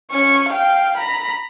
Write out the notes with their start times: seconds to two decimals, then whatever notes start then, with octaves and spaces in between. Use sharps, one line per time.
0.12 C#4 C#6
0.50 F5 G5
0.98 A#5 B5